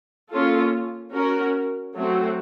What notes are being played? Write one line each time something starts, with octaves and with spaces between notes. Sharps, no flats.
A#3 C#4 F4 A4
C#4 F#4 A#4
F#3 A3 C4 F#4